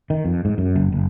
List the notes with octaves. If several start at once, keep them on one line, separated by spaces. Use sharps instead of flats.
D#3
F2
G#2
F#2
F#1
F#1